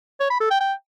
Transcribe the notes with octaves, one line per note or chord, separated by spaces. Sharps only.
C#5
B5
A4
G5
G5